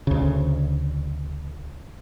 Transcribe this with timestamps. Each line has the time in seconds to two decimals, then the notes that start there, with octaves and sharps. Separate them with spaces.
0.07 D2 C#3